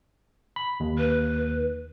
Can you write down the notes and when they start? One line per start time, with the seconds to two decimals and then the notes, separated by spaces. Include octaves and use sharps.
0.56 B5
0.80 D#2
0.98 B4